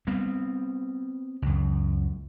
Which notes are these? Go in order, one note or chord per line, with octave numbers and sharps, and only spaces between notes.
G3 B3 C4
C#2 F#2